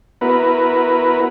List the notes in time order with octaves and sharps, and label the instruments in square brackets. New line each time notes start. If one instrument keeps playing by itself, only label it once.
[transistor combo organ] B3 E4 F#4 A#4 B4